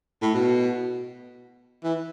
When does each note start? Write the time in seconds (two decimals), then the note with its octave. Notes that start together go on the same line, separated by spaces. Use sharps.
0.22 A2
0.34 B2
1.84 E3